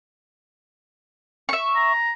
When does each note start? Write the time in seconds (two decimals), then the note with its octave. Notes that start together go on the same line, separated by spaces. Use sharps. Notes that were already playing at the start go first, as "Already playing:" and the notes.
1.49 E5 C#6
1.76 A#5